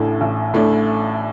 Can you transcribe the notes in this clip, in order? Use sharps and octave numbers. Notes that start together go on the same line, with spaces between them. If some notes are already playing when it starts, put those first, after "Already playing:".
Already playing: A1 A2 A3 D4
A1
A2 A3 D4